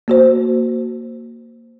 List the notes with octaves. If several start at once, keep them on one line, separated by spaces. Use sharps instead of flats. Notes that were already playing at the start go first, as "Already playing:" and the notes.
A#3 F#4 C5